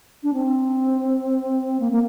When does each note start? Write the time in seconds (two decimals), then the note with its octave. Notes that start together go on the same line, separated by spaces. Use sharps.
0.23 D4
0.34 C4
1.79 A#3
1.91 A#3